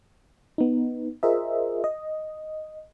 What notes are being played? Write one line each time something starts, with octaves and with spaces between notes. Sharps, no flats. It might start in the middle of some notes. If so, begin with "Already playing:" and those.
B3 D#4
F4 G#4 A#4 C5 D#5 E5
D#5